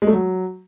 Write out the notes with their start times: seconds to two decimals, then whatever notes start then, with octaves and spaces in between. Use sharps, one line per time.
0.02 G#3
0.07 A3
0.13 F#3